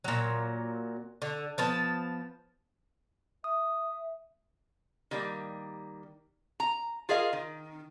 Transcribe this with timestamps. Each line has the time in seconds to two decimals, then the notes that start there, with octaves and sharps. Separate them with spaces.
0.04 A#2 F#3
1.22 D3
1.58 F3 B3 A5
3.44 E5 D#6
5.11 D#3 G3 A#3
6.60 A#5
7.09 F4 G#4 A#4 D#5 F5
7.33 D#3